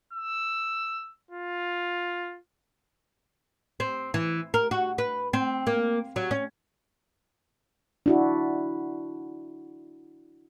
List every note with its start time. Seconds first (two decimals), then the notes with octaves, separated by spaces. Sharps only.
0.13 E6
1.31 F4
3.80 C4
4.14 E3
4.54 A#4
4.71 F#4
4.98 B4
5.33 C4
5.67 A#3
6.16 F#3
6.31 C#4
8.06 D4 E4 F#4